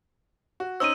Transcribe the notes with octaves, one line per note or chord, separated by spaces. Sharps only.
F#4
C#4 D#4 C5 E6 D#7